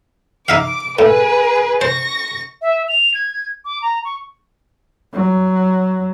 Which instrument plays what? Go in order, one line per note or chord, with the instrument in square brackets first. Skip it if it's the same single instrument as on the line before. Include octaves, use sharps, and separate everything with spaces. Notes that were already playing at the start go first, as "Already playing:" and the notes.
[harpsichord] D#4 E5 F5 [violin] D6
[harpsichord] A2 [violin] G#4 B4
[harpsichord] C5 [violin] C#6 A#6
[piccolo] E5
F7
G#6
D6
A#5
C#6
[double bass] F#3